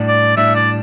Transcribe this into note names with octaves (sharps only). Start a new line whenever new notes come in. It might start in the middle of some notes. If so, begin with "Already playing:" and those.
Already playing: A2 G3 D4
D5
A2 G3 D4 E5
D5